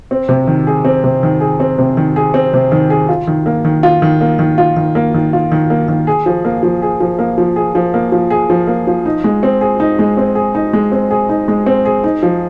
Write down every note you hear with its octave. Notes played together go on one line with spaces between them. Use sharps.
C4
C3
D#3
G#4
C4
C3
D#3
G#4
C4
C3
D#3
G#4
C4
C3
D#3
G#4
F4
D#3
A#3
D#3
F4
D#3
A#3
D#3
F4
D#3
A#3
D#3
F4
D#3
A#3
D#3
G#4
F3
A#3
F3
G#4
F3
A#3
F3
G#4
F3
A#3
F3
G#4
F3
A#3
F3
D#4
G#3
C4
G#4
D#4
G#3
C4
G#4
D#4
G#3
C4
G#4
D#4
G#3
C4
G#4
D#4
F3